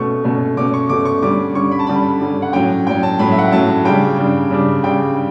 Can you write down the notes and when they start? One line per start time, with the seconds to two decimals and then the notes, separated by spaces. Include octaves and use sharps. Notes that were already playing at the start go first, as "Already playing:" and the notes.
Already playing: B2 A3 C#4 C#6
0.24 B2 A3 C#4
0.57 B2 A3 C#4 D6
0.74 C#6
0.89 B2 A3 C#4 D6
1.05 C#6
1.22 D3 G3 C#4 D6
1.55 D3 G3 C#4 C#6
1.72 B5
1.79 A5
1.87 D3 G3 C#4 B5
2.21 D3 G3 C#4
2.42 F#5
2.53 A2 F#3 C#4 G5
2.87 A2 F#3 C#4 G5
3.03 A5
3.19 A2 F#3 C#4 B5
3.31 E5
3.38 F#5
3.45 G5
3.52 A2 F#3 C#4 A5
3.85 C#3 G3 D4 G5
4.17 C#3 G3 D4
4.50 C#3 G3 D4
4.83 C#3 G3 D4 G5